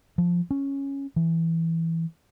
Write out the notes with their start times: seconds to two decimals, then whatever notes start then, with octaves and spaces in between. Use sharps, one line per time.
0.18 F3
0.51 C#4
1.16 E3